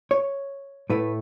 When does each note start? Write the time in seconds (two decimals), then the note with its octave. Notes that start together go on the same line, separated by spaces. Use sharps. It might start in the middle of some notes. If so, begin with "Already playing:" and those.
0.11 C#5
0.90 A2 A3 E4 B4